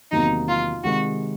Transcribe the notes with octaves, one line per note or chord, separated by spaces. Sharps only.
E2 C3 D#3 F#3 A#3 D#4
F4
C3 D#3 G#3 F#4